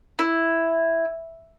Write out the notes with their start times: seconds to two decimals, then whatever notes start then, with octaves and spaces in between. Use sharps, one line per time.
0.19 E4